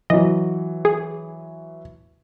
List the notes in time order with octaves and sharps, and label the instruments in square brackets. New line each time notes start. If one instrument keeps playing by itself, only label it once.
[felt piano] E3 F#3 [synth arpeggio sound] D#5
[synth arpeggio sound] G#4